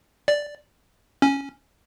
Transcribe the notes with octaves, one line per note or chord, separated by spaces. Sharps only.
D5
C#4